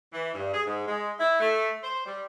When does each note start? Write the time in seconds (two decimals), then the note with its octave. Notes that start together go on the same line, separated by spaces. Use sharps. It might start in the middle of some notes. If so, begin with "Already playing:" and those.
0.13 E3
0.35 G2
0.53 G#4
0.67 G#2
0.87 G#3
1.19 E4
1.40 A3
1.83 C5
2.06 G3